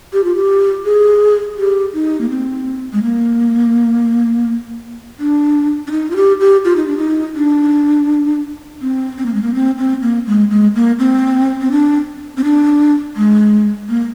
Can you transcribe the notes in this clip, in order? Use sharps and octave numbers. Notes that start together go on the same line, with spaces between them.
G4
F4
G4
G#4
G4
D#4
A#3
C4
G#3
A#3
D4
D4
D#4
F4
G4
G4
F4
D#4
D4
D#4
D4
C4
C4
A#3
G#3
A#3
C4
C4
A#3
G#3
G#3
A#3
C4
C4
D4
C4
D4
G#3
A#3